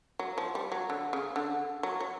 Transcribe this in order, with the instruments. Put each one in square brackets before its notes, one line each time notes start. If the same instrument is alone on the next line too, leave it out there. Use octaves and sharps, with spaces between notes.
[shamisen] F#3
F3
G3
F#3
D3
C#3
D3
F#3
F#3